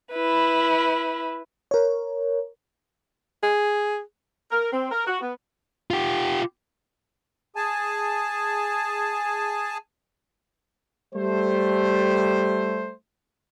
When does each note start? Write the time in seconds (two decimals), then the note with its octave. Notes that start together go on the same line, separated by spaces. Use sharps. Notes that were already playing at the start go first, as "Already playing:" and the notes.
0.12 E4 B4
1.71 A#4 C#5
3.43 G#4
4.51 A#4
4.73 C4
4.91 A#4
5.07 F#4
5.21 B3
5.91 F4 G4
7.56 G#4 G#5 A5
11.14 G3 A3 C5